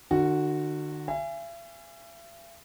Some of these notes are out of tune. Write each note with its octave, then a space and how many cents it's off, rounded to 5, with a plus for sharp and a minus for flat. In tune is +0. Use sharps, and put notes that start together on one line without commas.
D3 +45 F#4 -5
E5 +45 G#5 -10